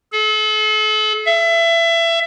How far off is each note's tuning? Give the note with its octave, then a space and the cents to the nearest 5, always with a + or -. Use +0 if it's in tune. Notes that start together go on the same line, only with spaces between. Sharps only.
A4 -40
E5 +25